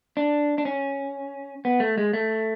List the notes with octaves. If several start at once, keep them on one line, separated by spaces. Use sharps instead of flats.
D4
D4
C#4
B3
A3
G#3
A3